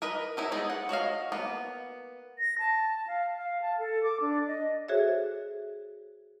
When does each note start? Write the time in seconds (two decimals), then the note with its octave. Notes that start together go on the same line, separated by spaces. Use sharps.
0.02 A#4 B4 D#5
0.37 C#4 D#4 E4
0.52 G#3 B3 D#4 G#4
0.70 F#5
0.89 F#4 C#5 D#5 F5
1.32 A#3 B3
2.38 A#6
2.59 A5
3.07 F5
3.35 F5
3.62 A5
3.78 A4
4.03 D6
4.21 D4
4.48 D#5
4.88 F#4 G#4 A4 C5 C#5 E5